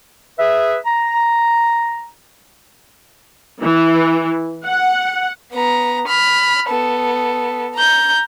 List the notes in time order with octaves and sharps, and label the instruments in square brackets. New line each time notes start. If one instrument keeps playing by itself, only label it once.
[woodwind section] G#4 B4 E5
A#5
[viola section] E3
F#5
[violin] B3 A#5
B5 F6
B3 A4
A#5 G6